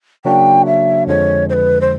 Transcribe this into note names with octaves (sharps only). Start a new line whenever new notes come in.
C#3 F#3 A#3 D4 F#4 G5
E5
F2 D3 F3 G#3 C#5
C5
B4
C5